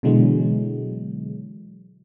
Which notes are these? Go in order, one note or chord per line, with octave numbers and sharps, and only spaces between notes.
B2 D3 E3 F#3 G#3